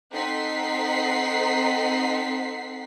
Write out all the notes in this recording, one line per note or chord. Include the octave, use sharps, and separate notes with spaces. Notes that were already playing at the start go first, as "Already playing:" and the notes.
C4 D#4 A4 F#5 B6 C7